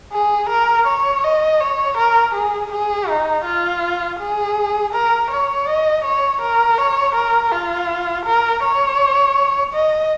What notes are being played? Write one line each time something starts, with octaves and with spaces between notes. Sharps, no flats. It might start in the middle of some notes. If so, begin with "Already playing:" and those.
G#4
A#4
C#5
D#5
C#5
A#4
G#4
G#4
D#4
F4
G#4
A#4
C#5
D#5
C#5
A#4
C#5
A#4
F4
A#4
C#5
D#5